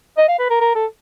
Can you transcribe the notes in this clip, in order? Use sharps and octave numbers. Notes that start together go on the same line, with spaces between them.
D#5
F5
B4
A#4
A#4
A4